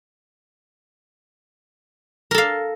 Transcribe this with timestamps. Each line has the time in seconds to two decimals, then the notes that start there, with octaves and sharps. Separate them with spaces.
2.31 A#4
2.34 A4
2.38 F5